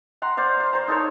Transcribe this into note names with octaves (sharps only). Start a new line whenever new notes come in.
F#5 A#5 C6
C5 D5 F5
F5
C5 A#5
D#4 A4 A#4 C#5